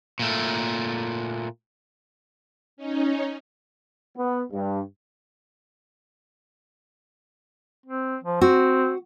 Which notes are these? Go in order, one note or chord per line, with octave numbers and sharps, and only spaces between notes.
A#2 A3
C#4 D#4
B3
G2
C4
F3
C4 F#4